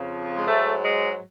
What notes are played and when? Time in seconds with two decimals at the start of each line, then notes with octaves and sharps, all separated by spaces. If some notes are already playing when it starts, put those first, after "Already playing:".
Already playing: F2 C#3 F3
0.35 G#3
0.46 G#2 F#3 A3
0.84 G#3